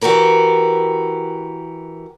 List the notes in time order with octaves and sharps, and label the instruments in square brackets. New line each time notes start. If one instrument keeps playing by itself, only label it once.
[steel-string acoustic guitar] E3 F#4 G4 A#4 B4